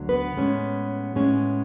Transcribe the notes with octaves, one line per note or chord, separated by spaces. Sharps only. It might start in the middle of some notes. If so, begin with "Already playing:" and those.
Already playing: D2 D3 F#3
B3 B4
A2 G#3 C#4
A2 G#3 C#4